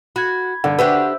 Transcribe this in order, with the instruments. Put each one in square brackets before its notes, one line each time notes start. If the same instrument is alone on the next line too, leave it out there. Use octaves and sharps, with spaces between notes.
[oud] F#4 [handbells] B5 G#6
[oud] G2 [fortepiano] D3
[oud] D4 G4 B4 [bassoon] F#4 [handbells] C5 E5 E6